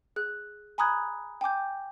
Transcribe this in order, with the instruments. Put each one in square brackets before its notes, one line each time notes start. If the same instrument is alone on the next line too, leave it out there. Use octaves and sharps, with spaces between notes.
[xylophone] G#4 F#6
G#5 A#5 B5 D#6 F#6 G#6
G5 G#5 D6 G6